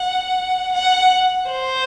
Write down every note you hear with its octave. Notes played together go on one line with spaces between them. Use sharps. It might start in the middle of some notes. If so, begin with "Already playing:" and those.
Already playing: F#5
F#5
C5